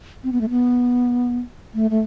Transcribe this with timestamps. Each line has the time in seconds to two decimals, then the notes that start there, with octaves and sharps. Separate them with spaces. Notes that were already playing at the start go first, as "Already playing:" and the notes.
0.24 C4
0.32 B3
0.41 A3
0.49 B3
1.74 A3
1.91 A3